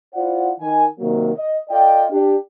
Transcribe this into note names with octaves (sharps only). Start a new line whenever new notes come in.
E4 F4 C5 D5 F#5
D#3 G#5
C3 D#3 F#3 A#3
D#5
F4 A4 D5 D#5 G5
D4 G4